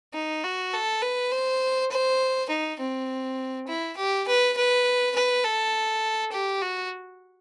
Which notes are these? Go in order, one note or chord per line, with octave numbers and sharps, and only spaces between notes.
D#4
F#4
A4
B4
C5
C5
D#4
C4
E4
G4
B4
B4
B4
A4
G4
F#4